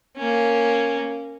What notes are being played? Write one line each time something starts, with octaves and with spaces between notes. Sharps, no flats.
A#3 C#4